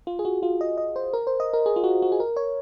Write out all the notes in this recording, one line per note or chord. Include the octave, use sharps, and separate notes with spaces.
F4
G#4
F#4
F4
D#5
D#5
C5
A#4
C5
D#5
A#4
G#4
F4
F#4
F#4
G#4
A#4
C#5